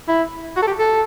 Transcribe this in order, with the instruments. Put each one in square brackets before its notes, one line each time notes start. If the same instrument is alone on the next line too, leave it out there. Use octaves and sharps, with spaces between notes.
[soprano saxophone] E4
F#4
A4
G4
A4